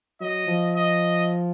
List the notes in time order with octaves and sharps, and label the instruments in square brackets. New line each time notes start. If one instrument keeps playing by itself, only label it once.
[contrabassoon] F#3 [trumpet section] D#5
[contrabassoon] F3
[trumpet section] D#5